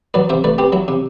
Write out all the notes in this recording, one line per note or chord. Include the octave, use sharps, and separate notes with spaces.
F#3 B4 D5
C3 C5 E5
A3 B4 D5
C4 G4 B4
F#3 E4
C3